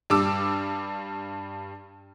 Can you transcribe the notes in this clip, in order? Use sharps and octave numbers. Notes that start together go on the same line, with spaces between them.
G2 G3 D6 E6